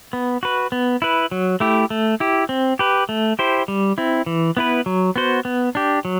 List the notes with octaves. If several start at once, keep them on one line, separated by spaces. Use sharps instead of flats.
B3
F#4 B4
B3
E4 B4
F#3
A3 E4 G4
A3
E4 G4
C4
G4 B4
A3
E4 G4 C5
G3
C4 E4
E3
B3 E4 B4
F#3
B3 F#4 C5
B3
D4 G4
F#3